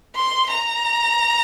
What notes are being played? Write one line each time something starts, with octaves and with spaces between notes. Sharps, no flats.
C6
A#5